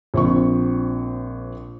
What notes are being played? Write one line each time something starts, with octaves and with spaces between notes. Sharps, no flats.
A#1 C4 C#6